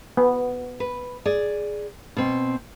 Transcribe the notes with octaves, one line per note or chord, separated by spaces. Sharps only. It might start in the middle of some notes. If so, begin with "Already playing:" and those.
B3
B4
G#4 D5
B2 C4